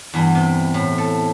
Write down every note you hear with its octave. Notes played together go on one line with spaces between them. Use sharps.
E2 G2
C3
A2
A4